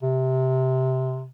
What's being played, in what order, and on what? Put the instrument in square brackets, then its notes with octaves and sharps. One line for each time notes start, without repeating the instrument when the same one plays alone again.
[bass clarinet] C3